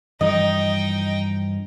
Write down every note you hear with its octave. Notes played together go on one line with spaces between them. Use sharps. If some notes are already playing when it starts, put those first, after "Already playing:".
G2 E3 F3 D#4 D#5 G5